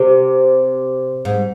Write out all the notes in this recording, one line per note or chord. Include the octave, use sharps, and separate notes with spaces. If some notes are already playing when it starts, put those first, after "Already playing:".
Already playing: C3
G#2